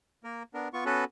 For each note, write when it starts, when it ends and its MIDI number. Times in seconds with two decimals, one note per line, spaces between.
0.24 0.43 58
0.24 0.43 70
0.54 0.68 59
0.54 0.68 62
0.54 0.68 70
0.73 0.85 59
0.73 0.85 65
0.73 0.85 85
0.86 1.04 59
0.86 1.04 61
0.86 1.04 66
0.86 1.04 69
0.86 1.04 71